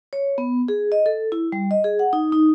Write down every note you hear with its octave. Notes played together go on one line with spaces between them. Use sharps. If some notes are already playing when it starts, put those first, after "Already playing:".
C#5
B3
G#4
D#5
A4
E4
G3
D#5
G#4
F#5
D#4
D#4